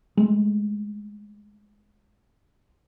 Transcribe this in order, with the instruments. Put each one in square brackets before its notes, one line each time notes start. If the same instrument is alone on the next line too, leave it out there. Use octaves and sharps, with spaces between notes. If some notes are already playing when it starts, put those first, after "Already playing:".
[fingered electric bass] G#3 A3